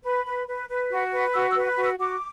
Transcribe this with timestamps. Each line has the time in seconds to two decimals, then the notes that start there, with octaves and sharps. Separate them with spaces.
0.03 B4 B5
0.26 B4
0.47 B4
0.69 B4
0.91 F#4
1.12 B4
1.34 F#4 E6
1.50 E6
1.56 B4
1.67 F#6
1.77 F#4
1.83 E6
1.99 F#4 D6